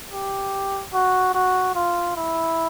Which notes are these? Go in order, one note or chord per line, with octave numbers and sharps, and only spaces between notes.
G4
F#4
F#4
F4
E4